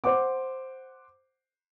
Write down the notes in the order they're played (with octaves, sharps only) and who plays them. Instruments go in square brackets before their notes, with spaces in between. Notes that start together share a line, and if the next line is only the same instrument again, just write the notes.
[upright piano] C5 F#5 D6